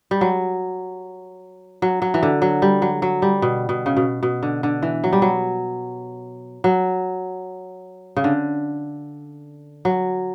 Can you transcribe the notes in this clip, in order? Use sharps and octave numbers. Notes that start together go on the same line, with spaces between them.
G3
F#3
F#3
F#3
E3
D3
F#3
G3
F#3
F#3
G3
B2
B2
C#3
B2
B2
D3
D3
E3
F#3
G3
F#3
F#3
C#3
D3
F#3